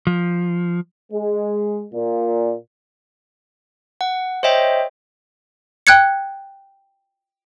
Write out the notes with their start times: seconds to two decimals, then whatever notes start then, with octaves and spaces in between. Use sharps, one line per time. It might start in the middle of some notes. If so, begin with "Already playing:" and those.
0.07 F3
1.12 G#3
1.93 A#2
4.01 F#5
4.43 C5 C#5 D#5 E5 G5
5.87 G5 F#6 G#6 C#7